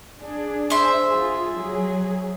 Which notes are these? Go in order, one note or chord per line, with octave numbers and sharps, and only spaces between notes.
D4 G#4
C5 E5
F4 G#4
F#3 G#4